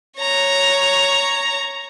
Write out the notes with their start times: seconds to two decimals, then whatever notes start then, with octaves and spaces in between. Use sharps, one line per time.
0.19 C#5 A#5